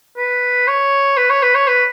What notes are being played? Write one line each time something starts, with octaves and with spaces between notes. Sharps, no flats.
B4
C#5
B4
C#5
B4
C#5
B4